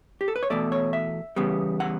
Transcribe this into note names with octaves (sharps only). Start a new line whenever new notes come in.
G4
A4
B4
C#5
E2 B2 A3 D5
C#5
E5
E2 C#3 G3 B3
F#5